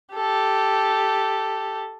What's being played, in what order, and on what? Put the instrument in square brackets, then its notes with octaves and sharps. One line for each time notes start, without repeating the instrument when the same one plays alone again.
[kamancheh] G4 A4